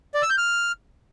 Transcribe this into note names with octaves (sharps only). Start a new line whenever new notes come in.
D5
E6
G6
F6